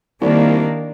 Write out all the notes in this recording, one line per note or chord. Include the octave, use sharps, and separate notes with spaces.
C2 D#3 A#3 D4